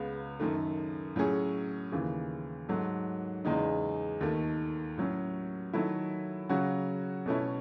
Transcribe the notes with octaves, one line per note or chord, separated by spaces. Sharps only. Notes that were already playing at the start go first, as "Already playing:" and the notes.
Already playing: C#2 C#3 G#3 B3
F#2 D#3 A3
A2 F#3 C#4 G#4
D#2 C#3 E3
G#2 F#3 A3
E2 C#3 G#3 D#4
D#2 D#3 A3
A2 F#3 C#4
D#3 F#3 A3 E4
C#3 F#3 C#4 F#4
B2 A3 C#4 E4